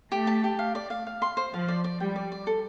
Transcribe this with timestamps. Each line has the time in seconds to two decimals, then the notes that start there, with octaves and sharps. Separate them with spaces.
0.12 A3 G4
0.27 A5
0.44 G4
0.59 F5
0.75 D5
0.90 F5
1.07 F5
1.22 C6
1.37 C5
1.53 F3 F5
1.68 D5
1.84 D5
2.00 G3 G5
2.16 D5
2.32 D5
2.47 A4